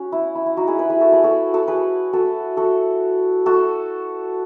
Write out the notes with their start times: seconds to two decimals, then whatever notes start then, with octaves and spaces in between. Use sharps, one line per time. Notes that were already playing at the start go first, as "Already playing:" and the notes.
Already playing: C#4 F#4
0.12 E4
0.35 E4
0.46 E4
0.57 D#4 F#4
0.67 E4 G#4
0.79 G#4 B4
0.90 E4 G#4
1.01 F#4 A4
1.12 G#4 B4
1.24 F#4 A4
1.54 F#4 A4
1.68 G#4 B4
2.13 F#4 A4
2.57 F#4 A4
3.46 F#4 A4